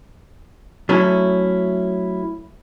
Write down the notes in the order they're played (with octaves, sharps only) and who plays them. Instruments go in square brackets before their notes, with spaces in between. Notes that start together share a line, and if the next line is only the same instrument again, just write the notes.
[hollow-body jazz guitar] F#3 A3 C#4 E4